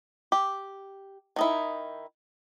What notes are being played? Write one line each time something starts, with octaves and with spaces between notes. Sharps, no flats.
G4
D#3 D#4 E4